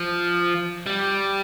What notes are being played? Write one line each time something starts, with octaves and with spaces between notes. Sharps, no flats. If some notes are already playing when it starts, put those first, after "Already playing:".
Already playing: F3
G3